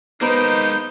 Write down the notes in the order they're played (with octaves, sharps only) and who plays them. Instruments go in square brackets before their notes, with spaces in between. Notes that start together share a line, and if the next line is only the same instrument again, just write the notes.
[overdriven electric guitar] G#3 A#3 [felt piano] B3 [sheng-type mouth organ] D#4 G6 [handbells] C5 A#5 B5